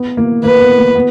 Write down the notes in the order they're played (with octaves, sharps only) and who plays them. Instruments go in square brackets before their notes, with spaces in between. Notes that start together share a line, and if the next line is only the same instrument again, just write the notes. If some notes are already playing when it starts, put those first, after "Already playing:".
Already playing: [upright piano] B3
A#3
[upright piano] A#3 [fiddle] B4
[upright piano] B3
A#3
B3